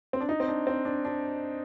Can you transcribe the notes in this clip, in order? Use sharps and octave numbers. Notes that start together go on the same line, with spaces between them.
C4
D4
D#4
C4
D4
C4
D4
D4